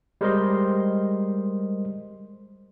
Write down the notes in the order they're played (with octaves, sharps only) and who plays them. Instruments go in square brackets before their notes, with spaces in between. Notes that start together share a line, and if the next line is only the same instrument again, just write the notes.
[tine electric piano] G3 G#3 A#4 C5 D#5 C6